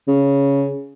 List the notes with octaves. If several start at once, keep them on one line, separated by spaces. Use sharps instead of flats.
C#3